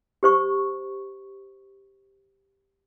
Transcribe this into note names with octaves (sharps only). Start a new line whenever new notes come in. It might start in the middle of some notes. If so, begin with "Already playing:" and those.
G4 C5 C#6